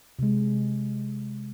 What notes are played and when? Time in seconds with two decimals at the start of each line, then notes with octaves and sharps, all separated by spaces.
0.19 C3 G#3